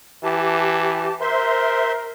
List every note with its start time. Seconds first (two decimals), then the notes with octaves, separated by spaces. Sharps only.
0.24 E3 G4 A5
1.21 A#4 C5 E5 C6